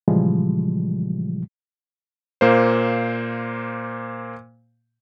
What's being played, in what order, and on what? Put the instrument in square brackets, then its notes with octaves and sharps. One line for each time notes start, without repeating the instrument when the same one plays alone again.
[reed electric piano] A#2 C#3 E3 F3 G3 G#3
[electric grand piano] A#2 A#3 C5